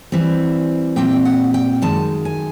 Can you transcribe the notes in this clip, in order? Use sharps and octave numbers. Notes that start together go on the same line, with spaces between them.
E3 G3 C4
A#2 G3 C4 G5
F#5
G5
F#2 D#3 G#3 A5
G#5